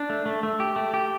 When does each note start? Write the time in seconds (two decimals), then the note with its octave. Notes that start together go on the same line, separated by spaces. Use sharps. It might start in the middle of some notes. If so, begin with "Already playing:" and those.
Already playing: D4
0.10 A3
0.26 A3
0.43 A3
0.60 G4
0.76 A3
0.94 G4